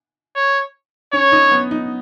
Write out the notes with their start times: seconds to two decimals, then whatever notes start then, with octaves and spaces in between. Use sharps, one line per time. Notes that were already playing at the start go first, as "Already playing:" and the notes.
0.36 C#5
1.13 C#4 C#5
1.32 D#4
1.52 B3
1.71 D#4